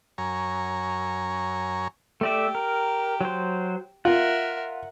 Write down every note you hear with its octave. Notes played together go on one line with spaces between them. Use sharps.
F#2 C#5 G#5 A#5
A3 G4 D5 E5
A#4
F#3 C5
F4 A#4 E5 F#5